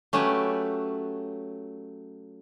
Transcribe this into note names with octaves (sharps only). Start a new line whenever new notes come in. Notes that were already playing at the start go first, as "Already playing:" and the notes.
F#3 A3 C#4 G4 B4